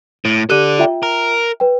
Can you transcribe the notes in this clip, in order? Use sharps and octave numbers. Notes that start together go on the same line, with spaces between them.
A2
G4 A4 D5 F#6 D#7
F4 E5 G5
A#4
B4 G5